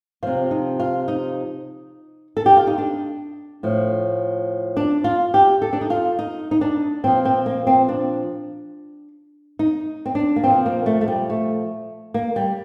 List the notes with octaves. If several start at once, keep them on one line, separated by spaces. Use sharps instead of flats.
C3 F3 F4
D#4
F4
D#4
A4
G4
F4
D#4
D4
A2 F3
D4
F4
G4
A4
D4
D#4
F4
D#4
D#4
D4
A#2 F3 C4
C4
A#3
C4
D4
D#4
C4
D4
A#3
A#2 F3 C4
A#3
A3
A3
G3
A3
A#3
G3